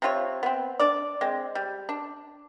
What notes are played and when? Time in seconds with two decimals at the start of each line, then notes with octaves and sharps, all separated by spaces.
0.02 C3 C4 F4 C#5
0.43 B3 C4
0.80 D4 D5
1.21 G#3 C4
1.55 G3
1.89 D4